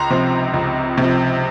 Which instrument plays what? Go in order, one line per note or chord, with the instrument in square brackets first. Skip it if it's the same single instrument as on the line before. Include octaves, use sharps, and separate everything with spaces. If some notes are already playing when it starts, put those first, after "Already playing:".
Already playing: [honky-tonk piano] C#2 A#5 C6
C3 F3
C#2
C3 F3